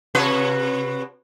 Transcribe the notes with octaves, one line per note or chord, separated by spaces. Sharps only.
C3 F#4 B4